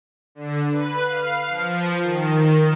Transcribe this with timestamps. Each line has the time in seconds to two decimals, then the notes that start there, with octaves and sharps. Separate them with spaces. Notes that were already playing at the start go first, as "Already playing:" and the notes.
0.35 D3
0.71 B4
1.05 F5
1.49 F3
2.01 D#3